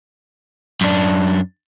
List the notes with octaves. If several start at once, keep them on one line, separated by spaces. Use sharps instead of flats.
F#2 D4